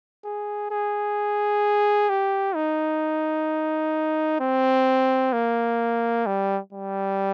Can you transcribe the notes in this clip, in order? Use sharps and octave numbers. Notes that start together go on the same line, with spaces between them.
G#4
G#4
G4
D#4
C4
A#3
G3
G3